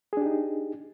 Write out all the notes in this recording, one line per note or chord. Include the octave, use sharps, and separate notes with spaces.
D4 D#4 G4 G#4